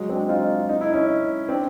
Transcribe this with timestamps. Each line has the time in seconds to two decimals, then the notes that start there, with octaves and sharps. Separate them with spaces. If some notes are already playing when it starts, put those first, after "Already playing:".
Already playing: F#3 G#3
0.09 C4 D4
0.29 D#4 F4
0.69 D#4
0.81 E4
0.92 C#4 D#4
1.49 C4 D4